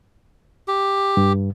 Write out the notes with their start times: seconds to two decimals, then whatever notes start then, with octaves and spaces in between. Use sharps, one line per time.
0.68 G4
1.17 G2